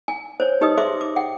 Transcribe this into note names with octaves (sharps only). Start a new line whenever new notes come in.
G#5
C5 C#5
D#4 G4 B4 D#5 D#6
G#4 C5 E5 C6 D6
D6
F#5 G5